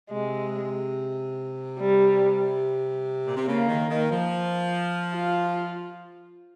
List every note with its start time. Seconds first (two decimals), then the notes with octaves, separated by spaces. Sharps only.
0.10 C3 G#3
1.79 G3
3.24 A#2
3.36 C3
3.47 C#3 A#3
3.67 D#3
3.89 D#3
4.10 F3
5.15 F4